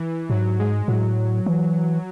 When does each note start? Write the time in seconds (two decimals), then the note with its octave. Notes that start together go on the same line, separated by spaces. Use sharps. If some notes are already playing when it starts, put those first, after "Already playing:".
Already playing: E3
0.30 G#2 F#3
0.59 G#3
0.88 A2 F#3
1.46 E3